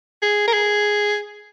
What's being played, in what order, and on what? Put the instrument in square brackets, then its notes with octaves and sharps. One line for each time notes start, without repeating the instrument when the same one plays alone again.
[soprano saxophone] G#4
A#4
G#4